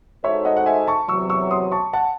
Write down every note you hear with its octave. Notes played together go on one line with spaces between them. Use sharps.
G#3 D#4 F#4 A4 C5 C#5 E5
D#5 F#5
F#5
E5 G#5
A5 C#6
E2 C3 F#3 C#6 E6
C#6 E6
C6 D#6
A5 C#6
F#5 A5